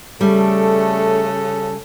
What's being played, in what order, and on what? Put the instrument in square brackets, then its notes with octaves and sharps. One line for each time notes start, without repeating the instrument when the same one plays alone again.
[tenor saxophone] C#3 [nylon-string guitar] G3 [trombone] A3 [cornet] A4